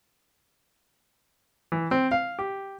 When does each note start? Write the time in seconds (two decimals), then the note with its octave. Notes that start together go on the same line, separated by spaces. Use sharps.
1.72 E3
1.91 C4
2.11 F5
2.39 G4